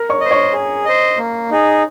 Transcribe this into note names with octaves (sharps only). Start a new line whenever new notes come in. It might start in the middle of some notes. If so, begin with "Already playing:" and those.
Already playing: A#4 A#5
C#5 C#6
D#5
C5
C#5 C#6
G#4
C5 D#5
A#3
D#4 G#4